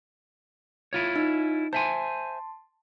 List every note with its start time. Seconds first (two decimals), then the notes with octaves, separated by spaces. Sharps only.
0.93 E4 F4 C#5
1.16 D#4
1.73 C5 E5 G#5 A5 C6